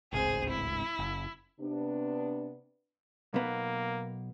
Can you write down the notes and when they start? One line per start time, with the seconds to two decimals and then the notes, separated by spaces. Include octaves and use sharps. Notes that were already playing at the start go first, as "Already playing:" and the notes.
0.13 D1 G#1 C#2 G#4 C5
0.50 E4
0.99 F#1
1.60 C3 B3 D4
3.34 B1 A#3 B3